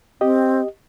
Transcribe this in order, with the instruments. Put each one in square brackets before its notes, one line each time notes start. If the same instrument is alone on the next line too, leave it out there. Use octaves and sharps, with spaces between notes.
[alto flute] C4 [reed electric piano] G4 D#5